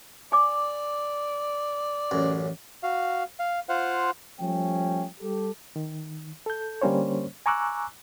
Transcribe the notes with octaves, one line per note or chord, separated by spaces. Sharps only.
D5 G#5 D6
A1 F#2
F#4 F5
F5
F4 C5 F5 F#5
F3 G3 A3 C#4 G5
G3 G4 A4
D#3
A4 G6
D3 G3 A#3 C#4 C5 C#5
G#5 A#5 C#6 D6 E6 F#6